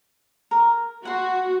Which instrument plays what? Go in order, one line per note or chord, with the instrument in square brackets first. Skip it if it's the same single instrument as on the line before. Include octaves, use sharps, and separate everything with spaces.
[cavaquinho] A#4
[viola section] F#4 [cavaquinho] F#5 C6